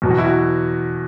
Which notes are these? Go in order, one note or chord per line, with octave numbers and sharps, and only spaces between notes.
E2 B2 F#3
F#4
E4
F#4